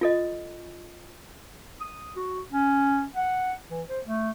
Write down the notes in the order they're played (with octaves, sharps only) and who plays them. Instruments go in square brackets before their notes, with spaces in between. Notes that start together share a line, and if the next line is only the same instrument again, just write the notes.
[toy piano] F4 A4 D#5
[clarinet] D#6
F#4
C#4
F#5
E3
C5
A3